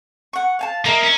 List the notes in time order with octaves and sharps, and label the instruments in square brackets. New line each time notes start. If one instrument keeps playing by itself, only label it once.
[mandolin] F#5 C#6
F5 G#5 A5
[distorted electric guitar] A#3 [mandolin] A#4 D#5 E5
[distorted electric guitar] C#4